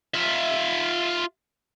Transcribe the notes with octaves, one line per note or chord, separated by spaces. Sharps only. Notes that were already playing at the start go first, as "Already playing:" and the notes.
F4 E5